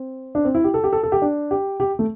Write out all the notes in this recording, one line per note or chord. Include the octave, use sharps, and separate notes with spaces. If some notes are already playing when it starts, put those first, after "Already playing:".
Already playing: C4
D4
C4
E4
G4
A4
G4
A4
A4
G4
D4
G4
G4
A3